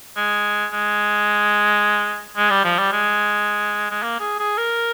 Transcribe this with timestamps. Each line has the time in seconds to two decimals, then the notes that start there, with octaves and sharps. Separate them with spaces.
0.16 G#3
0.72 G#3
2.37 G#3
2.50 G3
2.65 F3
2.79 G3
2.93 G#3
3.91 G#3
4.03 A#3
4.20 G#4
4.39 G#4
4.58 A#4